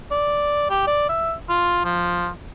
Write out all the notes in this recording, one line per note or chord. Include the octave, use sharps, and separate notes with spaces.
D5
G4
D5
E5
F4
F3